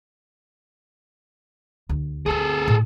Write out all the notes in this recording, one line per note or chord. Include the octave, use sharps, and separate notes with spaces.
D2
D2 C4 G#4 A4
A2